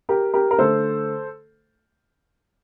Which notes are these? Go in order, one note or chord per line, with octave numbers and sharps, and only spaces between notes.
G4 A#4
G4 A#4
A#4
D3 A3 A4 C5